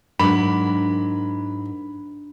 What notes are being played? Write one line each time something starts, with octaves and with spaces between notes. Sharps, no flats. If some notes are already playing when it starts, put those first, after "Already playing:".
G#2 F#3 D4 A#4 B5